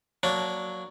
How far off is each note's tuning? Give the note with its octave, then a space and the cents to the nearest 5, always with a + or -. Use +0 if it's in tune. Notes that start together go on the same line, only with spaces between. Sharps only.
F#3 +0 A#3 +0 D4 -10